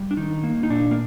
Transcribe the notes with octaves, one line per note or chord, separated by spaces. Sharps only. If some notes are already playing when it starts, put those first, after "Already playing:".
Already playing: G3
D4
D#3 D#4
A#3
D#4
A#2 D4
A#3